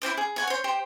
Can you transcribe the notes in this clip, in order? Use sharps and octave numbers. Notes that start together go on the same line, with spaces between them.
E4 F#4 C5 D6
G#4
F#5 G#5 C#6
C5 C#5
G4 C5 G5